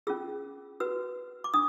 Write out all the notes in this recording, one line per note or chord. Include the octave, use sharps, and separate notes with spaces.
C#4 F4 G#4 E6
F#4 B4 E6
D6
D4 D#6